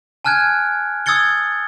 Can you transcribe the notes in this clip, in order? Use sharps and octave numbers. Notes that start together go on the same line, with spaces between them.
G#5 A5 F6 F#6 G#6 D7
D#6 E6 G#6 A6 C#7 G7